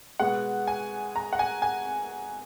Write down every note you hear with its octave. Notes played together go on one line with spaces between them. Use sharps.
B2 G#3 B3 F#5
G#5
A#5
F#5
G#5
G#5